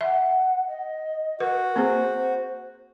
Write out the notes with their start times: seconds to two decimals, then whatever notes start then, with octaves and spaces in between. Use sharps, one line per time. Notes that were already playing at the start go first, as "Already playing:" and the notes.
0.01 E5 F#5
0.67 D#5
1.40 F#4 A#4 B4
1.76 A#3 C4 G#4 C5